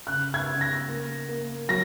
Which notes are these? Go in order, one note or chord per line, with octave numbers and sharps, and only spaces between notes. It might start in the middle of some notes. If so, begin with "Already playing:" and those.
C#3 F#6
G#6
C#3
A#6
A#3
A#3
F#3 A#6